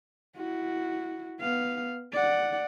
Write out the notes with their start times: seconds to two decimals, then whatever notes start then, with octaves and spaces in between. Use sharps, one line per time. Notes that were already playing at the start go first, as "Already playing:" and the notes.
0.36 E4 F#4
1.40 B3 F5
2.12 D5 F#5